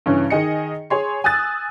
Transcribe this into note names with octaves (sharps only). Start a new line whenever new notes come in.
G2 C#3 E3 C#4
D#3 G#4 D#5 C#7
G#4 C#5 C6
G#5 D#6 E6 F#6 A6